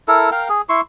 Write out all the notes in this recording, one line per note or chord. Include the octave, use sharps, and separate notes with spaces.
E4 A4 A#4
A#4 F5 G5
G#4
E4 C6 C#6